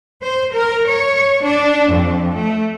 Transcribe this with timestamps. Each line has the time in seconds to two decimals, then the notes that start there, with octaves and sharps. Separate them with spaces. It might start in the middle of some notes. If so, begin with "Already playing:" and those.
0.22 C5
0.53 A#4
0.88 C#5
1.43 D4
1.91 F2
2.36 A3